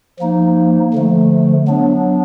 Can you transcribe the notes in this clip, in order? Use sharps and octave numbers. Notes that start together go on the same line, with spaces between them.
F3 A#3 D#4
D3 F3 A3
F#3 B3 D4